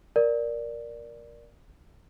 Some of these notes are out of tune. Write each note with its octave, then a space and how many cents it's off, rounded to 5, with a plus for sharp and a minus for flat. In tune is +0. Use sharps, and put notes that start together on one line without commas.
A#4 +10 D5 +0